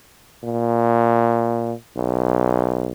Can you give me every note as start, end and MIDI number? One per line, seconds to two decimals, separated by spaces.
0.44 1.73 46
1.97 2.92 35